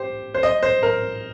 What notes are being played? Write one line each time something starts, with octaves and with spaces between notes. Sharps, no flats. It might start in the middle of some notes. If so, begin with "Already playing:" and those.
Already playing: G4 C5
C5
D#5
C5
A#4